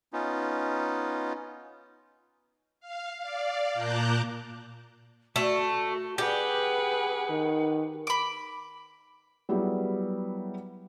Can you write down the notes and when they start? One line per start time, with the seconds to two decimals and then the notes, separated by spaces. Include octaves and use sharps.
0.13 B3 C#4 D#4 F4
2.80 F5
3.19 D5 F5
3.74 A#2 A5 A#5 D6 F#6 G6
5.36 A3 F#4
6.18 G4 G#4 B4 F#5
7.30 D#3
8.07 B5 D6
9.49 F#3 G3 B3 E4 G#4